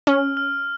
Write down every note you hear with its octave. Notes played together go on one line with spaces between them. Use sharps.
C#4 F6
F6